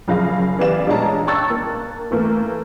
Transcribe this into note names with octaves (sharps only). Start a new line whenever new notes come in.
F#1 F3 G#4 F5 A#6
E3 B3 G4 D5 F5 E7
A#1 G#3 D4 C#5 A5 A#5
G5 A5 C#6 E6 F#6 A6
A#3
E3 A3 A#3